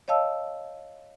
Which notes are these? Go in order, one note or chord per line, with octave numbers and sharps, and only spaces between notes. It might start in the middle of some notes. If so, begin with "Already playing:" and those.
C#5 D#5 F5 A5 E6